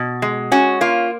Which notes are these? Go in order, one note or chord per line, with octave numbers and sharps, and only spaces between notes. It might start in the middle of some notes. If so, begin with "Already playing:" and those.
Already playing: B2
G#3
C#4 F#4
A#3 F4